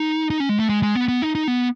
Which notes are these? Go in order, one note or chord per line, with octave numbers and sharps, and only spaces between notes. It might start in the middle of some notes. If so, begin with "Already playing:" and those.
Already playing: D#4
D#4
C#4
G#3
A3
G#3
G#3
B3
B3
D#4
D#4
B3